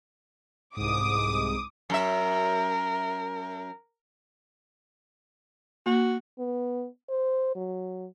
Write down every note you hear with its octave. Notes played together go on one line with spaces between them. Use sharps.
C2 G#2 D6 D#6
F#2 A#4 E5
A#3 F#4
B3
C5
F#3